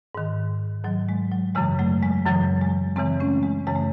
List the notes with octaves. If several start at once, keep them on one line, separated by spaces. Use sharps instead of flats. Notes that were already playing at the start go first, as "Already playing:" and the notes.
G#2 D#3
G#2 D#3 F#3
G#3
F#3
F#2 C#3 E3 G#3
F#3 A3
G#3
F#2 C#3 E3 F#3
G#3
F#2 C#3 E3 G#3 C4
A3 C#4
G#3
F#2 C#3 E3 G#3
A3